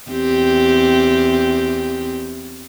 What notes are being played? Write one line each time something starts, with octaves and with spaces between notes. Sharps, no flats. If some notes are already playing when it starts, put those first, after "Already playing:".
E2 C4 G4